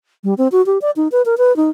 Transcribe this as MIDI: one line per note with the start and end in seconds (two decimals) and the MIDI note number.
0.24 0.34 55
0.38 0.48 60
0.52 0.64 66
0.66 0.78 67
0.82 0.91 74
0.96 1.08 63
1.12 1.22 71
1.26 1.35 70
1.38 1.55 71
1.56 1.70 63